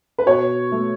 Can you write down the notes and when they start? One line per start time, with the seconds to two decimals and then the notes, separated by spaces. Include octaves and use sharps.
0.18 B4
0.26 B2 C#5
0.72 A3